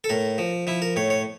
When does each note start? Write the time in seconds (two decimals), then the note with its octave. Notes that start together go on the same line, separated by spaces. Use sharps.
0.04 A4
0.09 A2 A#4
0.38 F3
0.67 F3 E4
0.82 A#4
0.96 A2 C#5
1.10 C#5